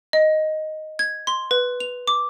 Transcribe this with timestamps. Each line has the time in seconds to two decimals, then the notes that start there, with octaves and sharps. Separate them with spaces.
0.13 D#5
0.99 G#6
1.27 C6
1.51 B4
1.80 F7
2.08 D6